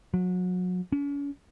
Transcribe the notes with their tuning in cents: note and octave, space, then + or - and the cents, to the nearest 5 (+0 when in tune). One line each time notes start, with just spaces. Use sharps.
F#3 -30
C#4 +40